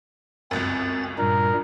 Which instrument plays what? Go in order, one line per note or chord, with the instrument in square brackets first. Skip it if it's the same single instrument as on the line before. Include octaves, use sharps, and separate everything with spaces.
[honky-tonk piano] G1 C#2 F#2 [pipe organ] C4 A6
[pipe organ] G2 A#2 G3 [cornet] A#4